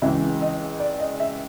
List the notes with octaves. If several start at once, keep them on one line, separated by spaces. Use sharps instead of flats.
C#2 C#3 E3 E5
D#5
D5
D#5
E5